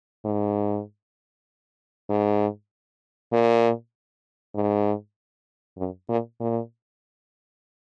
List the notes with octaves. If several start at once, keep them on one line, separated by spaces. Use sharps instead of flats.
G#2
G#2
A#2
G#2
F#2
A#2
A#2